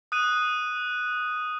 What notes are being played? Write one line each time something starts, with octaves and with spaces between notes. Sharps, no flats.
D#6 F#6 D#7